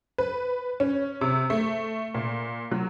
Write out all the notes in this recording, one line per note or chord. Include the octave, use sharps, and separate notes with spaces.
B4
C#4
C3
A3
A#2
F#3